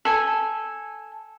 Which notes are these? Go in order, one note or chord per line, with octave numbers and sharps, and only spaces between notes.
A4 G#5